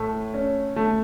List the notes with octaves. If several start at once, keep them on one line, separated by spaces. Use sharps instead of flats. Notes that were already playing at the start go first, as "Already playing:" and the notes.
Already playing: A2 A3
C#4
A3